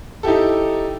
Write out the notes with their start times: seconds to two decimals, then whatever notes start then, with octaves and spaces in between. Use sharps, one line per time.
0.23 D#4 E4 G4 A4